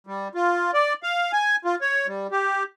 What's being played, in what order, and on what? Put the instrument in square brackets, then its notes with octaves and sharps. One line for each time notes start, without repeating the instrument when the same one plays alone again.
[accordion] G3
F4
D5
F5
G#5
F4
C#5
G3
G4